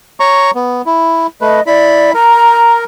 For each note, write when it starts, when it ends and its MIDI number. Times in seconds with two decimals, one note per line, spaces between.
0.20 0.51 73
0.20 0.51 82
0.20 0.51 85
0.55 0.82 59
0.86 1.27 64
1.41 1.60 57
1.41 1.60 71
1.41 1.63 75
1.67 2.13 64
1.67 2.11 74
1.67 2.13 83
2.14 2.84 70
2.14 2.79 82